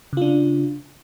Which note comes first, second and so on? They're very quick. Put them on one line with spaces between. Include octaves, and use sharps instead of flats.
C#3 F4 D4